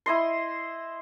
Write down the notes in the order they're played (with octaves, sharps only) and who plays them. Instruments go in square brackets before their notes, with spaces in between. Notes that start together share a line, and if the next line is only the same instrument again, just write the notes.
[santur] E4 D#5 C6